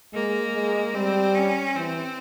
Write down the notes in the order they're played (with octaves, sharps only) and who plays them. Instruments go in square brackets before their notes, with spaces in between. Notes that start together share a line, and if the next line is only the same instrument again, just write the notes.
[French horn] G#3 [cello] A#3
[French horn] G#3
[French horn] G3 [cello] C4
[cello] C#4
[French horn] E3 [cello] C4